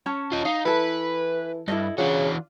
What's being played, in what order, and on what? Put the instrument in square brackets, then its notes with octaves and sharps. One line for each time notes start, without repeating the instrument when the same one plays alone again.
[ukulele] C#4 C#5 A5
[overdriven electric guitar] F4 D#5
[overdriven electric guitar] D#4 [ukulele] F5
[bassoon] E3 [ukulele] E4 A4 [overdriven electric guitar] B4
[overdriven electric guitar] G2 [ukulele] E4 A4 D#5
[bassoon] C#3 [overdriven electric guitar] E3 F#4 [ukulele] D4 F4